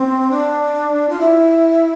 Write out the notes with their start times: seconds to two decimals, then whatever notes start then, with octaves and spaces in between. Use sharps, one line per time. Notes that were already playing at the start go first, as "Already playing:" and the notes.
Already playing: C4
0.31 D4
1.09 F4
1.20 E4